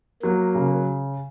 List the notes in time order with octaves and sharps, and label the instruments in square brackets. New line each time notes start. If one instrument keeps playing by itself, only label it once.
[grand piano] F#3 [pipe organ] A#3
[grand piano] C#3